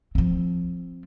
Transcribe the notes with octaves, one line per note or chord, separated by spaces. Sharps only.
F3 C4